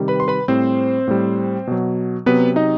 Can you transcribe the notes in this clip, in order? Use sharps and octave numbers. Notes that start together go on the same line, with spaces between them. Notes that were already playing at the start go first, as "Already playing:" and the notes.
Already playing: C3 D#3 G3
B4 B5
C6
B4 B5
A2 G3 C4 C5
A2 G3
B2 F#3
C3 F#3 B3 B4
D#4 D#5